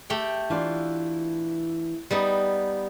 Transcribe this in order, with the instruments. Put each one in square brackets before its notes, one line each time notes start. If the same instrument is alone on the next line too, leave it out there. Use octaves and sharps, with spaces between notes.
[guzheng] A3 G4 G5
[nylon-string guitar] E3 D4 F4
[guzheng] G3 B3 D#4